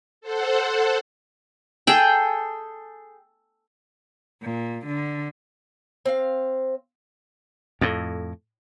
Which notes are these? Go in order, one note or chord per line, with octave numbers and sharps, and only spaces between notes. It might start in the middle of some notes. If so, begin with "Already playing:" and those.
A4 C5 F#5
G#4 A4 G5
A#2
D3
C4 F5
F2 A2